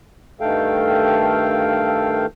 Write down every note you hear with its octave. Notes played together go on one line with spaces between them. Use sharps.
G2 D#3 A3 A4 F5 G5